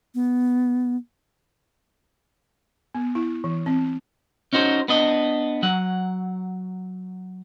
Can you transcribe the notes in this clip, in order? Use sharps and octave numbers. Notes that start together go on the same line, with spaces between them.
B3
B3
E4
E3
C4
C#4 D#4 F#4 B4 C5
B3 D4 D#5
F#3 F#5